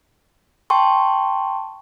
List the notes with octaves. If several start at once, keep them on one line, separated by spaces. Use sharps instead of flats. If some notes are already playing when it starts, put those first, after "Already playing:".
G5 A5 C6 C#6